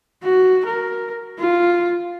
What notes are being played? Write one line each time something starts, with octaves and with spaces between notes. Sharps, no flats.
F#4
A#4
F4